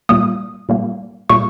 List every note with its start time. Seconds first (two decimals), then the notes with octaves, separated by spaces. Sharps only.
0.09 A#2 G3 A#3 D#6
0.69 A#2 G3 A#3
1.30 A#2 G3 A#3 C#6